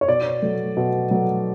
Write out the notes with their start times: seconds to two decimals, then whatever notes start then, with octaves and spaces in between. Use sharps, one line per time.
0.01 C#5
0.08 B2 D5
0.42 F#3 A3
0.77 B2
1.11 F#3 A3